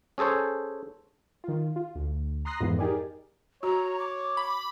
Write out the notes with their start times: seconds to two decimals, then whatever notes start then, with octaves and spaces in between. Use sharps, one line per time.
0.18 C#4 G#4 A4 C5 C#5
1.44 D#3 F4
1.76 F4
1.95 D2
2.45 A#5 C6 D#6 F#6 A#6 C7
2.61 F2 G#2 E3 B3
2.79 D#4 G4 G#4 A#4 D5
3.63 F#4 C#5 A#5
3.99 D6
4.37 B5